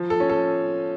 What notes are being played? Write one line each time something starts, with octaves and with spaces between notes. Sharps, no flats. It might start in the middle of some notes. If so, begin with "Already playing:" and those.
Already playing: F3
A4
C#4
A4